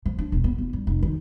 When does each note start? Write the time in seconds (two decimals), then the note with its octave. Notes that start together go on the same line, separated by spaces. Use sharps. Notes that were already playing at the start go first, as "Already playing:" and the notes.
0.06 F3
0.19 D4
0.32 E1
0.44 B3
0.58 E4
0.73 G2
0.87 F1
1.03 D#3